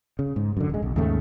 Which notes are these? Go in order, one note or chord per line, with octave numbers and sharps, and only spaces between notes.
C#3
G#2
F#2 D3
D#1 G#3
B1
D#2 G#2 C#3 A3